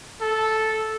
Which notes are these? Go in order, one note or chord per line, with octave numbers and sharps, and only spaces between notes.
A4